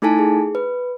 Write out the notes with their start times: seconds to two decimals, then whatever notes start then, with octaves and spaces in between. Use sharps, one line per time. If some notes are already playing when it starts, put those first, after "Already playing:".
0.02 A3 D#4 E4 A4 G#5 A5
0.19 G#4
0.55 B4